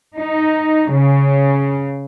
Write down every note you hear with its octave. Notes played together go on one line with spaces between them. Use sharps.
D#4
C#3